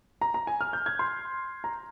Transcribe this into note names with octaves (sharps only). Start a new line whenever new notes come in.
A#5
A#5
G#5
F6
G6
G#6
C6
A#5